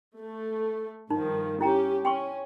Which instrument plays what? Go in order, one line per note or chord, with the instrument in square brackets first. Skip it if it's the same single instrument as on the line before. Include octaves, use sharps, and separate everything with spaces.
[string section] A3
[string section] G2 D#3 F3 [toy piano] D#4
[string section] C#4 G4 [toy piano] E4 G5 A#5
[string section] C#4 [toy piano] G5 C6 C#6